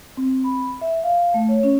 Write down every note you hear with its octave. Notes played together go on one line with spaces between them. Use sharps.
C4
B5
E5
F5
A3
C#5
C#4